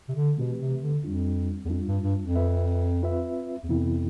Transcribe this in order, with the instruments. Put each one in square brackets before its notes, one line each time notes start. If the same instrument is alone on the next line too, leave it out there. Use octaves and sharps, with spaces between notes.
[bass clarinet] C3
D3
[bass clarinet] B2 [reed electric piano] E3 A3 C4 G4 B4
[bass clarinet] C3
D3
[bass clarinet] F2 [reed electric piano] G3 D4 F4
[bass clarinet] E2
[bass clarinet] F2 [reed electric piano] G3 D4 F4
[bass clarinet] G2
G2
F2
[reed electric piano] C4 F4 B4 E5
C4 F4 B4 E5
[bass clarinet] E2
[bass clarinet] F2 [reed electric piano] C3 E3 B3 E4